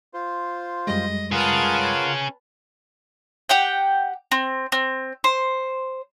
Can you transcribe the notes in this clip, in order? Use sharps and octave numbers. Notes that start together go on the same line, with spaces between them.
F4 C5
F#2 G3 G#3 D#5
C#4 F4 G#4 A#4 B4 F#5 A5
G4 F#5 G5
C4
C4
C5